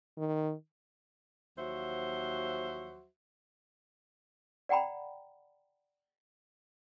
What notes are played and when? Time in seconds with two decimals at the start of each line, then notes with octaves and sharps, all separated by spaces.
0.18 D#3
1.58 D#2 F3 F#3 F#4 C5 E5
4.69 D5 F#5 G5 A#5 B5